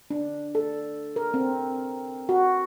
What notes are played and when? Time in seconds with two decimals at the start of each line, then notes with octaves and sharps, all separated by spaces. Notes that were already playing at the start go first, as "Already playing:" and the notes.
0.10 D4
0.55 A4
1.16 A#4
1.34 C4
2.29 F#4